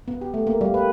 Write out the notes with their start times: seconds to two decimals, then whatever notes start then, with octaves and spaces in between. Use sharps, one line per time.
0.08 B3
0.21 G4
0.34 A3
0.47 A#3
0.61 G3
0.74 B4